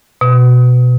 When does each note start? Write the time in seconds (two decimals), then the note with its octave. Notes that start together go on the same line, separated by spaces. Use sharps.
0.21 B2